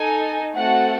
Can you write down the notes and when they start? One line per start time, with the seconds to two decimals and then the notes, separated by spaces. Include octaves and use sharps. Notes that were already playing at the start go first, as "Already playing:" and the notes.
Already playing: D#4 A4 G#5
0.55 A3 C4 F#4 A4 F#5